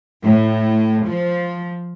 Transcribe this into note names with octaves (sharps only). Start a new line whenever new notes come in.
A2
F3